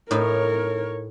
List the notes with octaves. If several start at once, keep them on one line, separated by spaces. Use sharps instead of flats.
A2 D#4 A#4 C#5